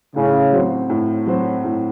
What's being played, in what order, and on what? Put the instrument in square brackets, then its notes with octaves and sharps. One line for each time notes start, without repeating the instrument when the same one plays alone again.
[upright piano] A2 [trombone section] C#3
[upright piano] F#3 C4 F#4 C5
A2
F#3 C4 F#4 C5
A2